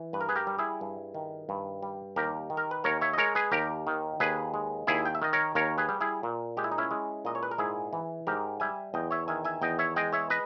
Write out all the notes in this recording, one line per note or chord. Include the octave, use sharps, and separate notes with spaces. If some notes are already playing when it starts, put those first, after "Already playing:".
Already playing: E3
G2 B4
A#4
G#4 B4
G4 A#4
G3
E4 G#4
G2
D#3
G2
G3
D#2 G4 A#4
D#3
A#4
B4
D#2 A#4 C#5
C#5 E5
D#5
G#3 A#4 C#5
G#4 B4
D#2 G4 A#4
D#3
D#2 G#4 B4
G#3
D#2 E4 G#4
G5
E5
D#3 D#5
A#4 C#5
D#2 A#4 C#5
G#4 B4
G3
E4 G#4
A#2
G#3 G4
E4
D#4
C#4 E4
G#3
A#2 D#5
C#5
B4
A#4
G#2 E4 G#4
E3
G#2 G4 A#4
G3 E5 G#5
E2 D#5 G5
C#5 E5
D#3 E5 G#5
E5 G#5
E2 D#5 G5
C#5 E5
G#3 D#5 G5
C#5 E5
B4 D#5